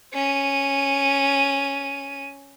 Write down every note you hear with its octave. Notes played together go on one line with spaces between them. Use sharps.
C#4 D#7